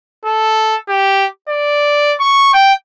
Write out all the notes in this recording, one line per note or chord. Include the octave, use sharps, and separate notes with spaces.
A4
G4
D5
C#6
G5